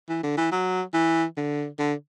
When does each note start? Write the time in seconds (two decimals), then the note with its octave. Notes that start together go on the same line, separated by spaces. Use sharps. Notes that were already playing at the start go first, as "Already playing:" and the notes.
0.09 E3
0.23 D3
0.37 E3
0.52 F#3
0.94 E3
1.37 D3
1.79 D3